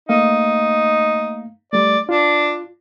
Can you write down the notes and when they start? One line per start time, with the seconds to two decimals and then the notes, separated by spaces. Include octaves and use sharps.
0.09 A3 A#3 D#4 F5
1.73 G3 A3 D5
2.09 D4 F4